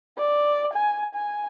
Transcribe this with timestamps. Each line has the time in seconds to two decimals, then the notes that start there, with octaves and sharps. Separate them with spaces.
0.18 D5
0.74 G#5
1.15 G#5